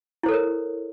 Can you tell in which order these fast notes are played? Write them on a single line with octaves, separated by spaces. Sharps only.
E4 C5 A4 C#5 A#4